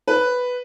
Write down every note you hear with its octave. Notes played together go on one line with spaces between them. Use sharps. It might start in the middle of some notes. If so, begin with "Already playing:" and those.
B4